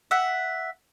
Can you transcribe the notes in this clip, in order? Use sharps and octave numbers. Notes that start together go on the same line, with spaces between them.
E5 F#5